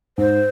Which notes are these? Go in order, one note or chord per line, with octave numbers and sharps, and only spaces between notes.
G#2 C5